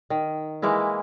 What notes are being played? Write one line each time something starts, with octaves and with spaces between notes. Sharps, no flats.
D#3
E3 G#3 A#3 E4